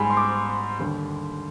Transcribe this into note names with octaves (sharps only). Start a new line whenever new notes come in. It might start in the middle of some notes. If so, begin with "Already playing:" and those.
Already playing: G#2 G3 G#5 B5
C6
D6
D#2 D3 G3